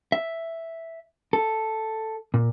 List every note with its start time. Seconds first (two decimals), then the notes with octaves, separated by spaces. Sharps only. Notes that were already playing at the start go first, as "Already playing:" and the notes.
0.12 E5
1.33 A4
2.34 A#2